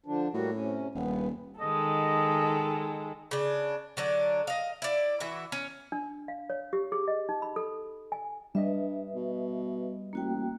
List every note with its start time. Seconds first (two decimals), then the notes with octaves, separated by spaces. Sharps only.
0.06 D3 F3 D4
0.33 A2 G3 A#3 F#4
0.55 C3 C#4
0.95 D#1 G2 B3
1.61 D#3 G#3 A4 D#5
3.31 C#3 D4
3.97 D3 F#3 D4
4.47 D#5 F5
4.82 E4 D5
5.20 E3 F#4 E5
5.52 C#4
5.92 D4
6.28 F5
6.50 C#5
6.73 G4
6.92 G#4
7.08 D#5
7.29 D#4
7.42 B5
7.56 A4
8.12 G#5
8.55 G2 G3 B4 D#5 E5
9.15 B2
10.13 A1 A#3 F#4 G5